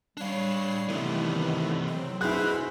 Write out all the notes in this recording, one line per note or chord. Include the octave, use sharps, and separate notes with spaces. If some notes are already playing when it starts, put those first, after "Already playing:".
G3 D4 C#5 F5 C7
C3 D#3 E3 A3 B3 E4
F#3 C4
E4 F#4 G#4 B4 C5 B5 F#6